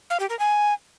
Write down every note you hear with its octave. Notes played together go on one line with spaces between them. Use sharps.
F5
G4
A#4
G#5